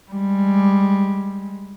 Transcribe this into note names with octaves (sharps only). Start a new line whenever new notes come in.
G3 G#3